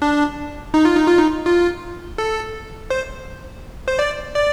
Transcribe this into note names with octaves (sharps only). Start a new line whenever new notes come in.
D4
D#4
F4
D#4
F4
D#4
F4
A4
C5
C5
D5
D5